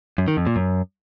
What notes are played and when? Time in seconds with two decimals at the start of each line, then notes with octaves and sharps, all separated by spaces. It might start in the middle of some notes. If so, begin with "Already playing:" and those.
0.18 F#2
0.28 D#3
0.37 F2
0.47 A#2
0.56 F#2